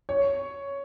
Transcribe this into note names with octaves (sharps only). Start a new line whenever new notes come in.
C#5